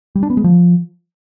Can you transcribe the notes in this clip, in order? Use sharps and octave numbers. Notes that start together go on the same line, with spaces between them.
G3
D4
B3
G#3
F3